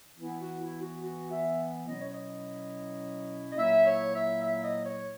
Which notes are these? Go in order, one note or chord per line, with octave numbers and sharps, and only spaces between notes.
E3 B3 E4
F#4
E4
F#4
F#4
E5
B2 F#3 C#4 E4 D#5
C#5
D#5
D#5
A#2 F#3 A#3 E4 E5
C#5
E5
E5
D#5
C#5